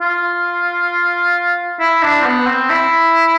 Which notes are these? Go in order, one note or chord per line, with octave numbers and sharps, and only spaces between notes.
F4
E4
D4
C4
B3
C4
E4